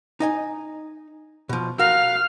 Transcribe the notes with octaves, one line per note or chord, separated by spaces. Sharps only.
D#4 D#5 G#5
B2 F3
F#4 A#4 F5 F6